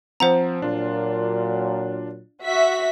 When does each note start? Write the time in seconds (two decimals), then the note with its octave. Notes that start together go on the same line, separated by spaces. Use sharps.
0.20 F3 C4 C5 F#5 A#5
0.62 A#2 F#3 D4 F4
2.43 F#4 E5 B6